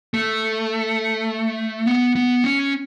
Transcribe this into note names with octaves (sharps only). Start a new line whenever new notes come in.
A3
B3
B3
C#4